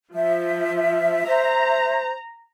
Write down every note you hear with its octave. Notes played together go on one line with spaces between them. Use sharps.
F3 E5
C5 A#5